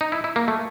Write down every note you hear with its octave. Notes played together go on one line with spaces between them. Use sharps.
D#4
E4
E4
A#3
A3